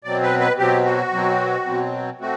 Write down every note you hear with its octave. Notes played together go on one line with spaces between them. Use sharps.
B2 F#3 C4 D5
B4
B4
B2 F#3 C4 G4
F#4
B2 F#3 C4
B2 F#3 C4
A3 C4 F#4